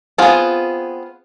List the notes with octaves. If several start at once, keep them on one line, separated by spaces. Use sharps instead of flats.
B3 C4 F4 G#4